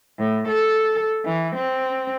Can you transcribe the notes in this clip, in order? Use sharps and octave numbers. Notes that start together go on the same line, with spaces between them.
A2
A4
E3
C4